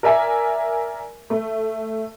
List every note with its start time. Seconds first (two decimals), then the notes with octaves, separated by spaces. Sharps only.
0.03 A#4 D5 E5 G#5
1.30 A3